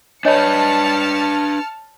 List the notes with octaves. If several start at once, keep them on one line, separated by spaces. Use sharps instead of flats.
D4 B4 C#5 D#5 G#5 A5 F6 C#7